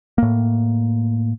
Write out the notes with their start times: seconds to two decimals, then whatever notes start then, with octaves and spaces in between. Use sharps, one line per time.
0.18 A2 A#3